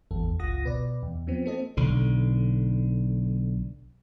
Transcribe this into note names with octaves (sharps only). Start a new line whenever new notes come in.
G#1 E2 A4
G1 C#2 F4 F#5 D#6 A#6
B2 B4 D5
E2
F3 B3 C4
A#3 C4 A4 D#5
B1 D3